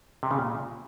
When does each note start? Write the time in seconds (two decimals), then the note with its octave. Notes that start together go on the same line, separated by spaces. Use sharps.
0.23 C3
0.31 C#3
0.39 A#2